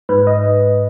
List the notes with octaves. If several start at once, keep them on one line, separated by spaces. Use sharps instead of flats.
G#2 B4
D#5